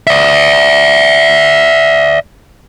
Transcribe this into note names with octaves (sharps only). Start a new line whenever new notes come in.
D5 E5